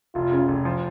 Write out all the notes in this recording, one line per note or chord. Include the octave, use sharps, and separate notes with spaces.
F1 F4
C#3
F1
F3